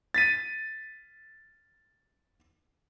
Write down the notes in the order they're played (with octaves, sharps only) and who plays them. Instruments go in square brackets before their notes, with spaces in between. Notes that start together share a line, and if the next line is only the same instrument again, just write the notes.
[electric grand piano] A6 B6 D#7